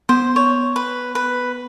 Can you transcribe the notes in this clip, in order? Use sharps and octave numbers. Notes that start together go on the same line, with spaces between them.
B3 C5
C#5
B4
B4